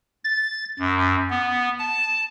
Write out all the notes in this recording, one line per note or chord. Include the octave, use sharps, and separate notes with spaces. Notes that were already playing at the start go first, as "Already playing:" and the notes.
A6
F#2
B3
A5